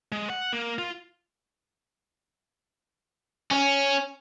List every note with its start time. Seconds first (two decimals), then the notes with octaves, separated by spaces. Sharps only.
0.12 G#3
0.30 F#5
0.53 A#3
0.79 F4
3.51 C#4